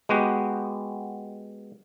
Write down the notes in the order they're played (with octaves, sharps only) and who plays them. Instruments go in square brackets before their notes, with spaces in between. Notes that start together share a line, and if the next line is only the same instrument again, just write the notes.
[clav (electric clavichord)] G#3 B3 F#4 G4